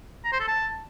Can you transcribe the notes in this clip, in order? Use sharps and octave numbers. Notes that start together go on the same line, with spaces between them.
A#5
C5
A4
A5